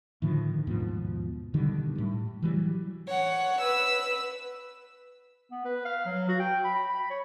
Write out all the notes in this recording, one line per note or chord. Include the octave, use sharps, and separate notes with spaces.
A2 D3 D#3 F3
D#2 G#2 B2 F3
B2 D3 D#3 G3
A2 G3
E3 F#3 G3
C#5 F#5
B4 E6
B3
B4
F5
F#3
F#4
G5
B5
B5
C#5